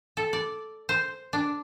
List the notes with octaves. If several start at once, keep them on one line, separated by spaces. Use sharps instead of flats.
A4
D5
C5
D4